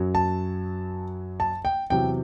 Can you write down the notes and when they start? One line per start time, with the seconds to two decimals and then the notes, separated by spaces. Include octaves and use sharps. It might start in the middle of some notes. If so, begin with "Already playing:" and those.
Already playing: F#2 F#3
0.15 A5
1.40 A5
1.65 G5
1.90 E2 C3 F#3 G5